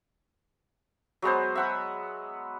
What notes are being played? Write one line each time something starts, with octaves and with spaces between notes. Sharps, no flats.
F#3 G#3 B3 C5
E5 F#5 B5